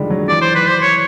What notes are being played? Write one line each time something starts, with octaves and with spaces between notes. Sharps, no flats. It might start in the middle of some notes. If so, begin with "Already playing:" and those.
Already playing: D3 D#3 F3 G3 G#3
F#3
E3 D5
C5
B4
C5
C#5